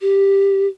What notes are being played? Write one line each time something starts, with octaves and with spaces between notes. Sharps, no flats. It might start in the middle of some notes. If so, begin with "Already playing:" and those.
G4